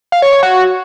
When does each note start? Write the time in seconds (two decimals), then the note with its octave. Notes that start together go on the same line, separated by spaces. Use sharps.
0.12 F5
0.22 C#5
0.33 C#5
0.43 F#4